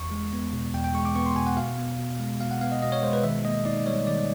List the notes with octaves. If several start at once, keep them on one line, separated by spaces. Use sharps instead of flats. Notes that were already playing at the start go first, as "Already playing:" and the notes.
Already playing: E2 C#6
G#3
B3
B2
E2 G5
G5
G#3 C#6
D6
B3 C#6
C6
B2 G#5
F#5
B2 F5
B3
B2
G#3
B2 F5
F#5
B3 F5
D#5
B2 D#5
C#5
G#3 C5
B4
D#3 E5
A#3 D#5
D#4 D5
G3 C#5
D#3 D5